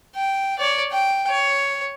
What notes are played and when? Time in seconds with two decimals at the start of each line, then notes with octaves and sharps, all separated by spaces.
0.15 G5
0.59 C#5 D5
0.92 G5
1.29 C#5